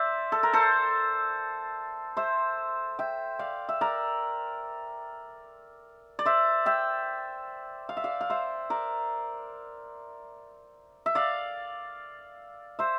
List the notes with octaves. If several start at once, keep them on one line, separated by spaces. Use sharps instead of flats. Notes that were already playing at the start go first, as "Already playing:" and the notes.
Already playing: C5 D5 E5
A4
A#4
A4 C5
C5 E5
E5 G5
D5 F5
E5
A#4 D5
D5
C5 E5
E5 G5
F5
E5
D5 F5
F5
C5 E5
A#4 D5
E5
D5 F5
C5 E5